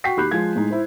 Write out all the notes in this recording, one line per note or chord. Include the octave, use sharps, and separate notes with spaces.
F#4 G5 B6 C7
D#2 G4 B5 F#6 G6
F3 G#3 G#6
A2 G#3 D#4
E4 C5